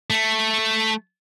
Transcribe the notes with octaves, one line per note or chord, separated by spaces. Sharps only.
A3